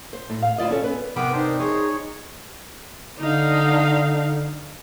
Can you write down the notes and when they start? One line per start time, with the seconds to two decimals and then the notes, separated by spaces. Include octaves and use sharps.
0.13 C5
0.30 A2
0.42 F5
0.58 D2 E4 F4 D5 D#5
0.70 C#4 A4
0.84 B3 B4
1.16 C3 B3 A#4 B4 G5 B5 D6
1.33 D4 D#4 C5
1.60 G#4 C5 C#5
3.20 D3 D#4 F5